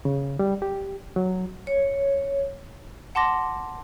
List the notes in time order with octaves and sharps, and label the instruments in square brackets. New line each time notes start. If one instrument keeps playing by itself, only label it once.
[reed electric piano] C#3
G3
G4
F#3
[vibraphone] C#5
[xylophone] F#5 A5 C6 D6 A#6